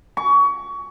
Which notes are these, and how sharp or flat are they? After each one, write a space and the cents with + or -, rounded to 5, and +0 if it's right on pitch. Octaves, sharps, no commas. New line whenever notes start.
C#6 +25